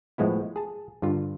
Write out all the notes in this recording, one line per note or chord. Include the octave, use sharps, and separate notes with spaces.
A2 F3 G#3 B3 E4
G#4 A5
G2 D3 F4